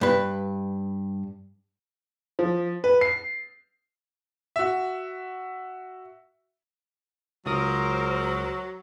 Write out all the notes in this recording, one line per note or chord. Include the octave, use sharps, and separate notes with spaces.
G2 B4
F3
B4
C7
F#4 E5
C#2 F#3 A#4 C5 D#6